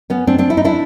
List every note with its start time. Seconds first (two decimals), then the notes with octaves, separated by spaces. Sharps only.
0.10 B3 C#4
0.27 C4 D4
0.38 C4 D4
0.50 E4
0.57 D#4
0.64 D4 E4